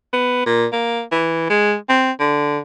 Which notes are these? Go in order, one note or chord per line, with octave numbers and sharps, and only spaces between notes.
B3
A#2
A#3
E3
G#3
C4
D3